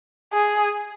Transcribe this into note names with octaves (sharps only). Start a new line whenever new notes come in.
G#4